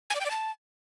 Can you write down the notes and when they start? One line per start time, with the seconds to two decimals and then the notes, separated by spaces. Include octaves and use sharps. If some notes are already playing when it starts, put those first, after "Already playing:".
0.10 G#5
0.15 D5
0.20 G5
0.25 D5
0.30 A5